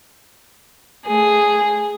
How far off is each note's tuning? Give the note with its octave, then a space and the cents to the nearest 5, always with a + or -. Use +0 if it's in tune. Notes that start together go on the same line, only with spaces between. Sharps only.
A3 +0 G#4 +0